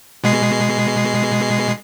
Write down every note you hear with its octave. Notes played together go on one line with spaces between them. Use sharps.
B2 G#3 C7